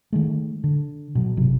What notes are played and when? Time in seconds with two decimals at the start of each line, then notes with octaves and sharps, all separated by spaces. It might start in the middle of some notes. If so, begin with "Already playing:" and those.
0.13 D#3 G#3 A3
0.64 D3
1.15 B2 F#3
1.37 G1 C3 F#3